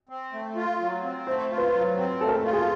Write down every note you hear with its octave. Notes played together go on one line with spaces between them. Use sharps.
C4
A3
F4
F#3
C4
A3 C5
F4
B4
F#3
C4
A3 A4
A#4
A4
F4
G#4